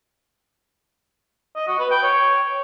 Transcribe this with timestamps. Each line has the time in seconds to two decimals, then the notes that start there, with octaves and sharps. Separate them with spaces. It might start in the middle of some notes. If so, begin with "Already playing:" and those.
1.56 D#5
1.68 F#4
1.79 B4
1.91 G5
2.03 C#5